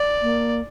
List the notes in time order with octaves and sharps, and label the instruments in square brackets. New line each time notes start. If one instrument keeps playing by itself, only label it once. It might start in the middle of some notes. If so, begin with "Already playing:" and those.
Already playing: [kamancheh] D5
[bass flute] A#3